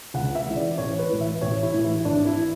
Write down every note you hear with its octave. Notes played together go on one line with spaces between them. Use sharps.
C#2 F#5
E5
C#3 E3
D5
A1 C#5
B4
A2 E3
E5
A1 C#5
E4
A2 E3
E4
G#1 D4
E4
E3